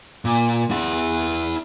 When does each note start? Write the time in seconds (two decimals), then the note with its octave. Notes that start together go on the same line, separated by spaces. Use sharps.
0.25 A#2
0.71 E4 F#5